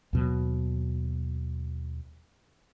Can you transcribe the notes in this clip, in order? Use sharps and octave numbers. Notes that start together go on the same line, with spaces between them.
D#2 B2 F#3